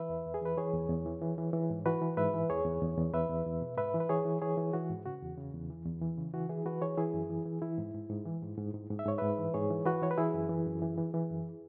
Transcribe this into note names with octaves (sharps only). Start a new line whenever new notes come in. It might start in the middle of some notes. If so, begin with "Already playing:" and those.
Already playing: E3 B4 E5
E2
E2
G#4
E3 B4
E3 G#4 C#5
E2
E2
E3
E3
E3
E3
G#2
E3 F#4 B4
E3
G#2 B4 E5
E3
E2 G#4 C#5
E2
E2
E2
E2 B4 E5
E2
E2
B2
G#2 B4 E5
E3
B4
E3 G#4 C#5
E3
E3 G#4 C#5
E3
E3 F#4
G#2
C#3 F#4
E2
C#3
E2
E3
E2
E3
C#3
E3 F#4
E3 E4 G#4
E3 F#4 B4
E3 G#4 C#5
E3 E4 G#4
F#2
E3
E3
E3 E4
G#2
G#2
G#2
E3
G#2
G#2
G#2
G#2
E5
G#2 C#5
G#2 B4 E5
E3
G#2 G#4 C#5
E3
E3 F#4 B4
E3 C#5
B4
E3 E4 G#4
F#2
E3
F#2
E3
E3
E3
F#2